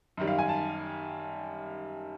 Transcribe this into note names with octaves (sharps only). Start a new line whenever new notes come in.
F#2 D#3 G3
F5
G#5
A5